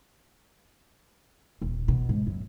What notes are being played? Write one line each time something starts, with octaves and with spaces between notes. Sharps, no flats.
D#1
B2
G#2
F#2